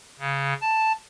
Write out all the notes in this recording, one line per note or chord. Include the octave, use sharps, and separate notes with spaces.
C#3
A5